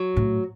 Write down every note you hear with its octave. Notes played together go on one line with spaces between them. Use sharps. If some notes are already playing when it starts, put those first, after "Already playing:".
Already playing: F#3
A2